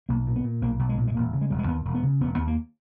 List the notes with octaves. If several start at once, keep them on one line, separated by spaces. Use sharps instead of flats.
B1 A#3
A#2
B3
A#2
B1 A#3
B1
G#3
A#2
G#3
E1 A#3
C#3
G#3
E1 G3
G#3
D#2 B3
E1
B3
C#3
E1 B3
D#2 B3
A#3